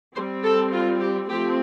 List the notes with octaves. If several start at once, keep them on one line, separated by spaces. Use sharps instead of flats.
G3 C4 C5
A4
F4
G4
F3 A3 C4 G4